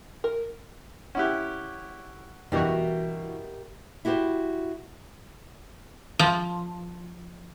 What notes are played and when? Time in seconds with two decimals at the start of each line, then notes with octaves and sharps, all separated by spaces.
0.24 A#4
1.15 C#4 E4 G4 F#5 C#6 F#6
2.52 G2 B2 E3 F#4 G4 A#4 E5
4.05 E4 F#4 G4 A#4 C5
6.19 F3